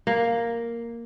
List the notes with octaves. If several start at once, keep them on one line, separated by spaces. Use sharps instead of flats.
A#3